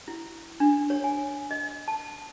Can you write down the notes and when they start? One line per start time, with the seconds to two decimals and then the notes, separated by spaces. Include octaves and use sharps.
0.08 E4
0.60 D4
0.90 C#5
1.04 G#5
1.51 D#5
1.88 A5